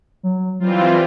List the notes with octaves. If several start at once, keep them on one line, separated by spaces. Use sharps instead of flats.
F#3
E3 F#3 G3 C4 F4